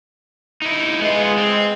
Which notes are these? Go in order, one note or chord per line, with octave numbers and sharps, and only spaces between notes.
D#4 E4
G#3 B3 F4
C4